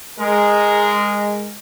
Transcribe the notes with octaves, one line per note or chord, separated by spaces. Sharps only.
G#3 A#4